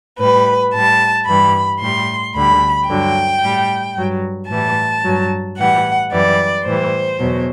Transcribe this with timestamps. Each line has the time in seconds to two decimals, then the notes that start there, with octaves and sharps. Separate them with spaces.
0.19 A2 G3 B4
0.74 A2 G3 A5
1.27 G2 E3 G3 B5
1.81 A2 G3 C6
2.35 D2 D3 G3 B5
2.89 G2 D3 F#3 G5
3.43 A2 G3
3.97 G2 F#3
4.50 A2 E3 G3 A5
5.04 G2 F#3
5.58 A2 E3 G3 F#5
6.12 F#2 E3 G3 D5
6.66 A2 E3 G3 C5
7.20 E2 B2 F#3